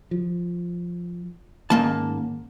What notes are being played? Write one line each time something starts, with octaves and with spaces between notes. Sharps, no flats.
F3
G#2 D#3 A#3 C#4 A5